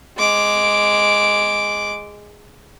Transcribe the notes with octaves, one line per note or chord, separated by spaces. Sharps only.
G#3 D6